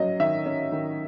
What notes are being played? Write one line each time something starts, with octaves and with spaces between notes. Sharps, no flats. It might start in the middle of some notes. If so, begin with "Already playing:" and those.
Already playing: F#3 C#4 D#5
D#3 E5
C#4
D#3